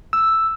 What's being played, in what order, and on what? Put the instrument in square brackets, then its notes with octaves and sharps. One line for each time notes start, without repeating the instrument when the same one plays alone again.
[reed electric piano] E6